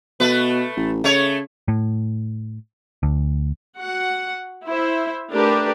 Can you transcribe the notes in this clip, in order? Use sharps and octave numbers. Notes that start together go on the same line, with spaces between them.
B2 A3 B4
A1
C#3 A3 C#5
A2
D2
F#4 F#5
E4 C5 E5
A3 D4 G4 A#4 B4